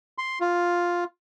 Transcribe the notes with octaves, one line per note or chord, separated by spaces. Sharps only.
C6
F4